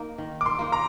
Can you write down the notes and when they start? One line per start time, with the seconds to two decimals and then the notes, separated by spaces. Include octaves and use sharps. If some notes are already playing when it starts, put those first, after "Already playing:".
Already playing: A#3 D#4
0.18 D#3
0.41 D6
0.46 C6
0.59 A#3 D#4
0.72 A#5